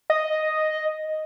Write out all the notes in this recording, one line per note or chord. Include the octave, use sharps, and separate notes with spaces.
D#5